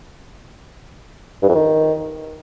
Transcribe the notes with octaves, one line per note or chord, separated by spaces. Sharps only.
G2
F2
D#3